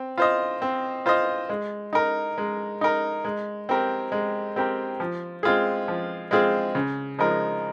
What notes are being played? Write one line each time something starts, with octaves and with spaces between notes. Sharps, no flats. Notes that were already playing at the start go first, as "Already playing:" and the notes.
Already playing: C4
F4 C5 D#5
C4
F4 C5 D#5
G#3
D#4 A#4
G#3
D#4 A#4
G#3
C4 G4 A#4
G#3
C4 G4 A#4
F3
G#3 C4 F4 G#4
F3
G#3 C4 F4 G#4
C#3
F3 G#3 D#4 A#4